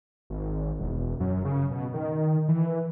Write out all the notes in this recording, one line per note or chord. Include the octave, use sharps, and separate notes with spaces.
G#1
E1
F#2
C#3
B2
D#3
E3